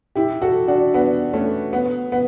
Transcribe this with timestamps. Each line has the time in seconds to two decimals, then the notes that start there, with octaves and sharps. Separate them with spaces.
0.15 E4 G4
0.42 F#4 A4
0.68 D4 F#4
0.94 B3 D4
1.33 A3 C#4
1.73 B3
2.12 B3